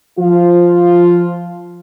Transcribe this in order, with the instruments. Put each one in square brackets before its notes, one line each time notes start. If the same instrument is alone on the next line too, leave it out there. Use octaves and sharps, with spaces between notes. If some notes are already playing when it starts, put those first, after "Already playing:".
[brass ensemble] F3 F4